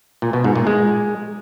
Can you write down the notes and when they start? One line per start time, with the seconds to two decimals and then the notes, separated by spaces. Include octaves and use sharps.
0.22 A#2
0.33 B2
0.44 G#2
0.56 A#2
0.67 G#3